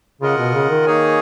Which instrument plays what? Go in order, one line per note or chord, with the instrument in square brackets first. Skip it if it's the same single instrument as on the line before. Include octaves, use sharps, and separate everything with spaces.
[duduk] C#3 [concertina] F4 A#4 D#5 F#5
[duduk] B2
C#3
D#3
[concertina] A#3 D#4 G#4 C#5 G#5